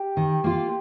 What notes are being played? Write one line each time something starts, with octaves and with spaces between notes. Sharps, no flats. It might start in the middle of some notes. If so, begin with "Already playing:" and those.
Already playing: G4
D#3
A#3 F4